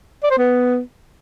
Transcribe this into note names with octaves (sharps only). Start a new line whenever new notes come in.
D5
C5
B3